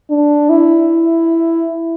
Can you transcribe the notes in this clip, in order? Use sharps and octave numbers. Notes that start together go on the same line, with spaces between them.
D4
E4